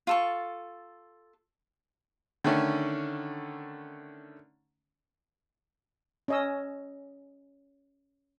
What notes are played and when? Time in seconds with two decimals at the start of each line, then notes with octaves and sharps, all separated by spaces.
0.07 F4 A4 C#6
2.44 D3 D#3 A3 C#4
6.28 C#4 D#5 E6